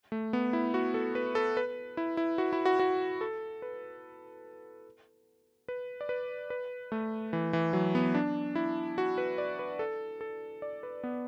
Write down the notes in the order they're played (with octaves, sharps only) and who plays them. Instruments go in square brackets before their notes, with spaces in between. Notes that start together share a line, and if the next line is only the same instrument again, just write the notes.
[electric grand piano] A3
B3
E4
F#4
A4
B4
A4
B4
E4
E4
F#4
E4
F#4
F#4
A4
B4
B4
D5
B4
B4
A3
E3
E3
F#3
B3
D4
E4
F#4
B4
D5
B4
A4
A4
D5
B4
B3